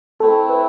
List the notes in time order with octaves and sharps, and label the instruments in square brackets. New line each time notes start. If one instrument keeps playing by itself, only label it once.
[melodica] A3 C4 E4 [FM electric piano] A4
[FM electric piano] B4